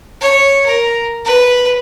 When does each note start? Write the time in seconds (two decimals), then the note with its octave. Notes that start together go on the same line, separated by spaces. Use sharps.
0.21 C#5
0.66 A#4
1.25 B4